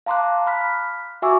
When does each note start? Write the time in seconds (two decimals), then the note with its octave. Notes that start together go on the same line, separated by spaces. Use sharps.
0.06 F5 A5 A#5 C6 D6 F#6
0.47 B5 F6 B6
1.22 F#4 E5 G#5 C#6 D6 E6